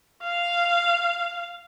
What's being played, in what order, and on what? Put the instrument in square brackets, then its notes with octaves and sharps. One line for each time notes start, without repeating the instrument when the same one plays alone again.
[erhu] F5